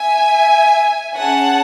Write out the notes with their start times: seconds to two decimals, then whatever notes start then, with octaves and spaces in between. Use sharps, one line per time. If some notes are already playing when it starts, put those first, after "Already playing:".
Already playing: E5 G#5
1.17 C#4 G#4 F#5 A5